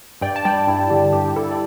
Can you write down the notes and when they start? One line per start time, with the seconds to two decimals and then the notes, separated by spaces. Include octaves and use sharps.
0.21 G2 D5 G5
0.36 A5
0.45 G3 D5 G5
0.67 G2 E4
0.90 D3 G4
1.13 G2 G4
1.28 G4
1.36 G2 E4 A4
1.51 D5